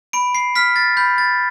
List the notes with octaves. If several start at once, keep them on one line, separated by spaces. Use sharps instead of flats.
B5 D7
C7
F6 B6
A6
B5 G6
A6